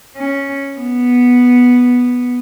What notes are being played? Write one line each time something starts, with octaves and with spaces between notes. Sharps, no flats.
C#4
B3